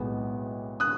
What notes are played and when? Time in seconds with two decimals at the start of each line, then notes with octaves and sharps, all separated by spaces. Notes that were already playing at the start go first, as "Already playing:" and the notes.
Already playing: B1 A2 G#3 B3
0.80 D#6 F#6